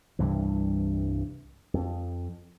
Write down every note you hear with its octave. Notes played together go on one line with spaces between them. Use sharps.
C2 G2 E3
F2